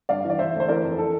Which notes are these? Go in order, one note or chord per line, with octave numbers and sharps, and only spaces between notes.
G2 D5 F5
E3
D5
E3 C5 E5
D2
C5
E3 A#4 D5
F2
E3 A4